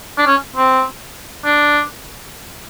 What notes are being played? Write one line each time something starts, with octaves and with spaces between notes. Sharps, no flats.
D4
C#4
C4
D4